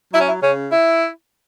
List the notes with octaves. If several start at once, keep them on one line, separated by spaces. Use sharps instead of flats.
F#3 E4
C#4
E4
C#3 C#4
E4